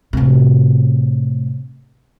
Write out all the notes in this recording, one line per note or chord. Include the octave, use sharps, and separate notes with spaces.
A2 C3